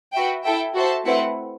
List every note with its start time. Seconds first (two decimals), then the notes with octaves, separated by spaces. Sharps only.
0.13 F#4 B4 E5 G5
0.44 E4 A4 E5 G5
0.74 F#4 A4 C5 E5 A5
1.05 A3 C4 E4 B4 F#5